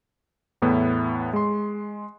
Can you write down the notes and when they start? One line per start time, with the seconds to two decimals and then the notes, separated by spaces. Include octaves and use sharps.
0.62 E2 A2 B3 E4
1.33 G#3 C6